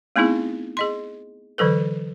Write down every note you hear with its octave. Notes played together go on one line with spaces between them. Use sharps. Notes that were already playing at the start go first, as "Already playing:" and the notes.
A3 B3 C4 D#4 E4 G#4
G#4 D#5 C6
D3 E3 F#3 A4 B4